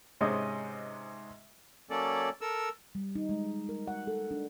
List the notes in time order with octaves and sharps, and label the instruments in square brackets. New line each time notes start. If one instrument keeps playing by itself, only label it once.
[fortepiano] G#2 C3 G#3 C#4 D#5 D#6
[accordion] F#3 A#3 C#4 A4 D5
A4 A#4 E6
[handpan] G3
D#4
G#3
A#4
F#5
A4
D4